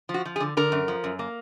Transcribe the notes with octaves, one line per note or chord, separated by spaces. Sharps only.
F3
F#4
F3
G#4
D3
D3 A#4
F#2
F3
F#2
A#3